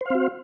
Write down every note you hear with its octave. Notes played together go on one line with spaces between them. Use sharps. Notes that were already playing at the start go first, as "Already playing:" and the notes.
C4 F#4 C5 F5